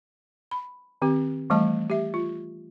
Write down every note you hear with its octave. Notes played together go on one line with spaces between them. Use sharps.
B5
D#3 C4 G4
E3 G3 A3 D#5 A5
G4 E5
F4